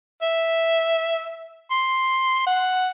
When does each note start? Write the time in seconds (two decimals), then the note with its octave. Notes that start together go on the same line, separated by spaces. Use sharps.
0.22 E5
1.71 C6
2.47 F#5